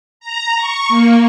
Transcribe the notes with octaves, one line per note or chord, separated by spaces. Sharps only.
A#5
C#6
A#3